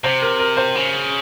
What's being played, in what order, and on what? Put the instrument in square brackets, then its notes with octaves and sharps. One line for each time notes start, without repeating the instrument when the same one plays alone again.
[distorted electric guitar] C3 [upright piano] C5
[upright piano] A#4
A#4
C5
[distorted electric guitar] C#3